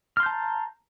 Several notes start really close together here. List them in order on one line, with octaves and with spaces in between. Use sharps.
F6 C6 G6 A5 A#5